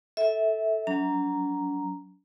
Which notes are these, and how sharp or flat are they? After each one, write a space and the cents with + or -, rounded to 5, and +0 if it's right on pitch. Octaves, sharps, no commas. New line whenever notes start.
A4 +0 E5 -20
F#3 +0 D4 -45 A#5 +0